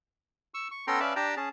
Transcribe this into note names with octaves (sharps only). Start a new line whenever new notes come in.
C#6 E6
C#6
B3 C#4 A4 G5 A#5 C6
C#4 B4 D5 E5 F5 A5
D4 G4 G5 A5 A#5
C#4 G#4 A5